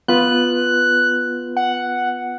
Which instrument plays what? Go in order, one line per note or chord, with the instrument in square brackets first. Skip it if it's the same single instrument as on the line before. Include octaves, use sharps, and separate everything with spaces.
[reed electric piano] B3 F4 B4 [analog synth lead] F#6
[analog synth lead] F#5